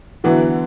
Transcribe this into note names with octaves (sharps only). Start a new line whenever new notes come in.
D3 E3 F#3 B3 E4